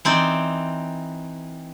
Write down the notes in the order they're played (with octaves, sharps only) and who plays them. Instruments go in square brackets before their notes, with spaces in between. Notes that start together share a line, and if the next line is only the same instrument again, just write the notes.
[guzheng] E3 C4 D#4 D5